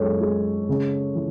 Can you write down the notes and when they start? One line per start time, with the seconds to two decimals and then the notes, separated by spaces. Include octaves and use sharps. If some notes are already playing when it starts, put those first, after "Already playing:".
Already playing: F#2 G#3 A4 C#5
0.21 G#3
0.69 C#3
1.15 E3